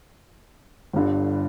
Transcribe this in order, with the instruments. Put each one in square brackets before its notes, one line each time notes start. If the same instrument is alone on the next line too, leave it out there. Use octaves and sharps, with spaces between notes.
[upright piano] G1 G2 D3